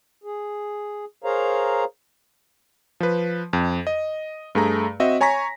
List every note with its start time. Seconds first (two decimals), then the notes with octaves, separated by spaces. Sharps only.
0.24 G#4
1.24 G#4 A#4 C5 C#5 F5 A#5
3.00 F3 B4
3.53 F2
3.87 D#5
4.55 G2 A3 G#4 A#5
5.00 C4 F#4 D#5 E5
5.21 C#5 G#5 A#5 C#6 A#6 B6